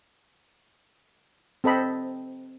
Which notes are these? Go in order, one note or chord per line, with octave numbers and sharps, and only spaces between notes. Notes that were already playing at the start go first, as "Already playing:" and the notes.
C4 A4 D#5 B5